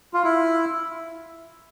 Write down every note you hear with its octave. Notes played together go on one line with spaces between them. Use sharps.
F4
E4